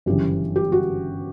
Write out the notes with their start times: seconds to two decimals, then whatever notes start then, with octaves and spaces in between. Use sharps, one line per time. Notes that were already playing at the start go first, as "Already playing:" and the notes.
0.06 G1 F#2 C#3 E3 G4
0.56 G4
0.72 F#4